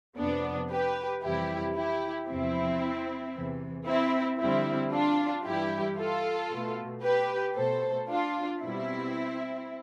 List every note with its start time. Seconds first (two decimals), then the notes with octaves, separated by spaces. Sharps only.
0.17 F2 C3 F3 B3 D4
0.70 G4 B4
1.23 F2 C3 E3 G3 E4 G4
1.75 E4 G4
2.28 E2 C3 F3 C4 E4
3.34 E2 C3 E3
3.86 C4 E4
4.40 F2 D3 G3 C4 E4
4.92 D4 F4
5.45 G2 E3 G3 E4 G4
5.98 F4 A4
6.50 B2 A3
7.03 G4 B4
7.56 B2 A3 A4 C5
8.08 D4 F4
8.62 B2 G3 C4 E4